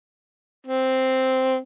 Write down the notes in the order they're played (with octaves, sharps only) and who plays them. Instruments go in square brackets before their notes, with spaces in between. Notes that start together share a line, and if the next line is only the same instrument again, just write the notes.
[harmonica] C4